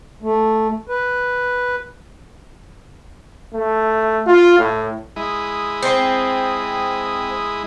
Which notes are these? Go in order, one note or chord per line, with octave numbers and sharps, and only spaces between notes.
A3
B4
A3
F4
A2
G#3 E4 D#6
C4